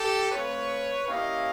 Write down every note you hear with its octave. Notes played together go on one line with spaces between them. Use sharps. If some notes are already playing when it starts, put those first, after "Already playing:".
Already playing: G4 A4
A3 C4 F4 B4 C#5
A#3 C#4 E4 G4 D#5 F5